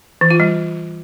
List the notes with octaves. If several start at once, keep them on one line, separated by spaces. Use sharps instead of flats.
E3
F4
G3